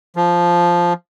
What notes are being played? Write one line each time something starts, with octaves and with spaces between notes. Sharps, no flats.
F3